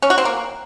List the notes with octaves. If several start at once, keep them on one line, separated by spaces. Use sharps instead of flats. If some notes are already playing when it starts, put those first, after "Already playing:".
C#4
F#4
C4
A#3